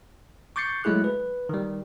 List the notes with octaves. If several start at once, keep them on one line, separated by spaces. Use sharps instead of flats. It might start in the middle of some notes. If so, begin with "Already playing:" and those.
C#6 D6 G6 A6 C7 C#7
F#3 G#3 A3 E4 G#4 F#6
B4
D#3 G3